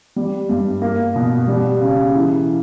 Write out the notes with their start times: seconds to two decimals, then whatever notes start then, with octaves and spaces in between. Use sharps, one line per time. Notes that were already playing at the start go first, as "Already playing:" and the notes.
0.16 G3
0.49 G2
0.81 A#3
1.16 B2
1.48 G3
1.80 C#3
2.15 E3